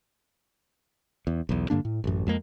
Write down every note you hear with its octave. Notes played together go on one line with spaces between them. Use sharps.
E2
B1 E2
G2 D3 A#3 D4
A2
A1 F#2
F2 G#3 A#3